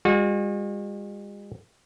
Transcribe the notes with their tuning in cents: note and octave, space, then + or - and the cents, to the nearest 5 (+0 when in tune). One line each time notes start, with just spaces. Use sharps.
G#3 -45 F#4 -40